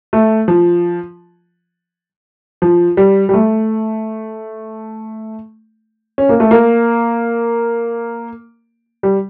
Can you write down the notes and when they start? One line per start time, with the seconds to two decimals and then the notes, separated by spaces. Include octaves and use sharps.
0.13 A3
0.48 F3
2.62 F3
2.97 G3
3.29 G3
3.34 A3
6.18 C#4
6.29 A#3
6.40 A3
6.51 A#3
9.03 G3